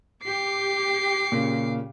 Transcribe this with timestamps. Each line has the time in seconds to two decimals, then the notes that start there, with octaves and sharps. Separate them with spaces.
0.24 G4 D6 C7
1.32 A#2 C#3